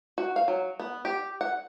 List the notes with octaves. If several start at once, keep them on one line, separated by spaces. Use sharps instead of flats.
F#4
F5
F#3
B3
G4
F#5